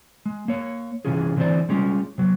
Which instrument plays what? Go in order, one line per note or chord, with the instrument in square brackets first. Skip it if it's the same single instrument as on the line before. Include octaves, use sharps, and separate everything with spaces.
[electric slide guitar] G#3
A#3 C#5
C3 E3 C#4 F4 G#4
D3 E3 C4 D#4 C5 D5
G3 G#3 C#4 F4
C3 F#3